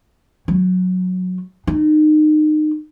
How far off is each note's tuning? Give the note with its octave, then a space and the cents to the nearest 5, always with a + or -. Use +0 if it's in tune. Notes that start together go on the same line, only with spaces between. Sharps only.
F#3 -15
D#4 -25